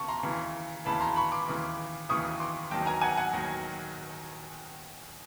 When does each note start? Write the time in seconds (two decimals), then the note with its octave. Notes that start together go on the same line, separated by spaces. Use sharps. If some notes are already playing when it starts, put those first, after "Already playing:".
Already playing: D#2 C#3 A5 C#6
0.08 A#5 C6
0.23 D#2 C#3 E3
0.85 D#2 C#3 E3 A5 B5
1.00 A#5 C6
1.16 B5 C#6
1.32 C6 D6
1.48 D#2 C#3 E3
2.09 D#2 C#3 E3 C#6 D#6
2.40 C6 D6
2.71 D#2 D#3 F#3 G5 A5
2.86 G#5 A#5
3.02 F#5 G#5
3.17 F#5 G#5
3.33 D#2 D#3 F#3